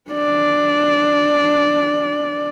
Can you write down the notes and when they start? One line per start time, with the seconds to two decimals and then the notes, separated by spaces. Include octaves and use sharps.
0.11 D4 D5